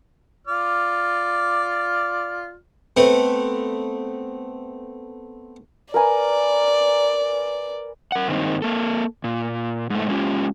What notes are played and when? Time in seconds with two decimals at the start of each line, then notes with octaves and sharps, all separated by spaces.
0.47 F4 D5 F6
2.97 A3 B3 C4 B4
5.94 A#4 B4 D5 G#5
8.12 A#4 F#5
8.28 G2 D#3 G#3 A#3 C4 D#4
8.62 A#3 A4
9.24 A#2
9.90 G#2 A3
10.09 G#3 A3 C#4 E4 F4 G4